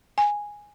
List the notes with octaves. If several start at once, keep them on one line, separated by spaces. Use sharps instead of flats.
G#5